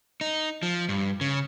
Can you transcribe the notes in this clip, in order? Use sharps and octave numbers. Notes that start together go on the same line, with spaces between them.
D#4
F3
G2
C#3